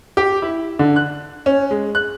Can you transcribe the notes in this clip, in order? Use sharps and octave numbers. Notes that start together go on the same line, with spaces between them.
G4
E4
D3
F#6
C#4
G#3
F#6